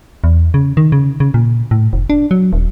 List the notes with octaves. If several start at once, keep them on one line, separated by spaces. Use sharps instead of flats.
E2
C#3
D#3
C#3
C#3
A#2
A2
F1
D4
F#3
D#1